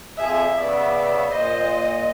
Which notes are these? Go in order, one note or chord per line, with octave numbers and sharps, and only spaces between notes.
F2 F3 G#4 E5
C#3 B3 D5 E5
A#2 C5 D#5